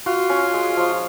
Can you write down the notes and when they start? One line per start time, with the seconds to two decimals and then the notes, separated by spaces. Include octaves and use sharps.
0.06 F4 F#4
0.30 C#4
0.54 G#3
0.77 F3